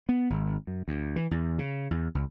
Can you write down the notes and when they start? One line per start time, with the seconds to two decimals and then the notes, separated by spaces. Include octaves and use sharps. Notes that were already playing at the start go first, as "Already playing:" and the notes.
0.09 B3
0.30 G#1
0.67 F#2
0.88 D2
1.16 E3
1.31 E2
1.59 C#3
1.91 E2
2.15 C#2